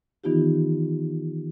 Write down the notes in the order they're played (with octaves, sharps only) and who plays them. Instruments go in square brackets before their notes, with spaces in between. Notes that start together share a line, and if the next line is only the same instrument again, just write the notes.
[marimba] D#3 E3 B3 D#4 F4 G4